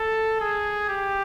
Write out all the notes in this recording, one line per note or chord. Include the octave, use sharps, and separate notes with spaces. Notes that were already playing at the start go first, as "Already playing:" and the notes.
Already playing: A4
G#4
G4